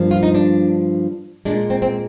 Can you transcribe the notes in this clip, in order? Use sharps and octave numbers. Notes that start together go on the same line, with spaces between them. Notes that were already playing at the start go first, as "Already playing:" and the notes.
Already playing: G2 F3 A#3
F4
D#4
D4
A#2 G#3 D4
C4
C4